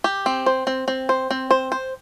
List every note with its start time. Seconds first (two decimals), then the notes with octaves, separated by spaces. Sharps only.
0.04 G4
0.26 C4
0.46 C5
0.67 C4
0.88 C4
1.09 C5
1.31 C4
1.51 C5
1.72 C5